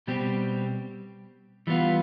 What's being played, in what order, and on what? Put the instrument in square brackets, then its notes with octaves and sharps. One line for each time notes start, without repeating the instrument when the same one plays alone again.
[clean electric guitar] B2 G3 C4 G4
E3 G3 B3 F4